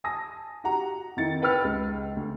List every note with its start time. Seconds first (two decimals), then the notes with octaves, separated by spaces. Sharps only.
0.04 G#5 A5 D#6 A#6
0.64 F#4 G4 F#5 A#5
1.17 F2 D#3 E4 A6 C#7
1.42 B4 G5 B5 F6
1.64 C#2
2.16 D2